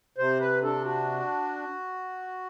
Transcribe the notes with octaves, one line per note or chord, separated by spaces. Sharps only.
C3 C5
B4
D4 A4
F#4